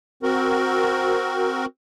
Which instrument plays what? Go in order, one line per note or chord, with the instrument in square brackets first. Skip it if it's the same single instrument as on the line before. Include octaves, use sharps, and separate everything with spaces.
[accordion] C4 F#4 A#4